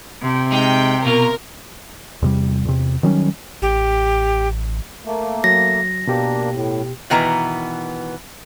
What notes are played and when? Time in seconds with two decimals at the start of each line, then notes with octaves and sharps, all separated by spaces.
0.23 C3
0.52 G#3 D#4 G5
1.05 B2 F4 A#4
2.22 E2 C3 G3
2.65 E2 C3
3.03 D#3 F#3 G3 C#4
3.62 A1 G4
5.06 A3 A#3
5.44 F#3 A#6
6.07 B2 A#3 D4 G4
6.53 A2
7.10 B2 D#3 E3 B3 A#5